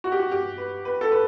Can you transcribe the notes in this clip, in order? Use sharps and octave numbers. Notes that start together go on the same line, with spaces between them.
F#4
G4
F#4
G4
B4
B4
A4
B4